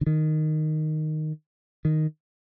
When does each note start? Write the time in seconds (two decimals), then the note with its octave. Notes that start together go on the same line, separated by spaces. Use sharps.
0.01 D3
0.07 D#3
1.85 D#3